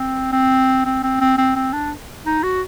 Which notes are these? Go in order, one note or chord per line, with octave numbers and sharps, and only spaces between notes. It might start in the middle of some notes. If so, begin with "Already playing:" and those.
Already playing: C4
C4
C4
C4
C4
C4
C4
D4
D#4
F#4